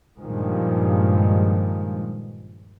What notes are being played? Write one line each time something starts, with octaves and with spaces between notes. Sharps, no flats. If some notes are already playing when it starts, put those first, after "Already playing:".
G2 A#2 D#3 F3 G#3